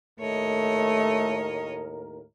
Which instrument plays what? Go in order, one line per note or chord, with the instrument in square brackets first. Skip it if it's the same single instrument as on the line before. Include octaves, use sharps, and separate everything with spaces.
[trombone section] D#2 A2 A#4 [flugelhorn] A3 [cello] C#5 D#5